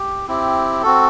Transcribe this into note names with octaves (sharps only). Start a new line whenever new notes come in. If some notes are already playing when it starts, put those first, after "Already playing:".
Already playing: G4
C4 E4 G4
C4 F#4 A4